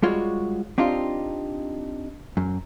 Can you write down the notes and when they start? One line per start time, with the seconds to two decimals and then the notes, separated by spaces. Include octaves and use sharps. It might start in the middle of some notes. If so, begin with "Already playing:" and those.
0.03 G3 G#3 F4 F#4 C#5
0.78 C4 D4 D#4 F4 G4
2.37 F#2